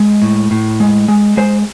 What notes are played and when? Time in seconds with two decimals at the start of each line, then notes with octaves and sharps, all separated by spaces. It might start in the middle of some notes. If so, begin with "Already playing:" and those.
Already playing: G#3
0.22 A2
0.51 A2
0.80 G#3
1.08 G#3
1.37 G#3 C5